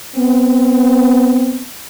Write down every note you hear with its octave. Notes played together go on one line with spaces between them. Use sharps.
B3 C4